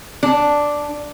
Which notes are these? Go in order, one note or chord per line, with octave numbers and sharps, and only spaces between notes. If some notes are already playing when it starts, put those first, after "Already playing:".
D4